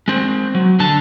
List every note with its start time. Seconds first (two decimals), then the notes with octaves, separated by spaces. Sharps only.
0.08 G#3 C4
0.55 F#3
0.80 D3 A5